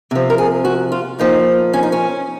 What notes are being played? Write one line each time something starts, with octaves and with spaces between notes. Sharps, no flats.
C3 F3
A#4
G#4
F#4
F4
A#2 F3 D#4
C#4
D#4
C#4